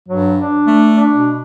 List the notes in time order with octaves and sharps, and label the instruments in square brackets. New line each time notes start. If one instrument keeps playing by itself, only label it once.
[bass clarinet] G2 [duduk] F#3
[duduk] D4
[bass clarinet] A3
[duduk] D4
[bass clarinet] B2